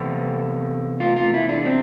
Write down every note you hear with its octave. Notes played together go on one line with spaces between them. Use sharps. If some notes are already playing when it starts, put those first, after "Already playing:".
Already playing: E2 C3 A4
F4
F4
E4
D4
C4